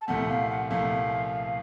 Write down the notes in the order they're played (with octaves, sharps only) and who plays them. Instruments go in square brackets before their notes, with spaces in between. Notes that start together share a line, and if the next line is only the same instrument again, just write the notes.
[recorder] A5
[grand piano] C2 A#2 F3 A3 [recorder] F#5
[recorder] F5
F#5
[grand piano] C2 A#2 F3 A3 [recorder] F5